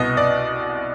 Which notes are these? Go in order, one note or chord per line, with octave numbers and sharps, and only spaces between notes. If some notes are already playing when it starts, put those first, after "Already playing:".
Already playing: C2 B2 B3 D#5
D5